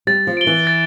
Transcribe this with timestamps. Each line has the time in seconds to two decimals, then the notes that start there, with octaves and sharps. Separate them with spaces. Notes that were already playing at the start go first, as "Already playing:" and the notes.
0.07 G3 A6
0.27 F3
0.37 D7 G7
0.47 E3
0.67 A6